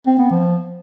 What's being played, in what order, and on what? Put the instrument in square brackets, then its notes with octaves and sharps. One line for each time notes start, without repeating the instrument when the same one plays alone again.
[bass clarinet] C4
B3
F3